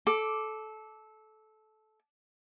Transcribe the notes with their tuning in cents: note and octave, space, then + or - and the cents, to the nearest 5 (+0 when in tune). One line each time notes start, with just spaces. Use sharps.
A4 -20 D6 +0